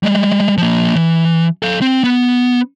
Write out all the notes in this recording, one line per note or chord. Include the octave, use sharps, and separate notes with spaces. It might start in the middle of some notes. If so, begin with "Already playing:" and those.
G3 G#3
F3 A#3
E3
A4 F5
C4
B3